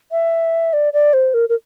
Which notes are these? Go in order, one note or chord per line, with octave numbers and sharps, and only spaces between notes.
E5
D5
D5
C5
A#4
A#4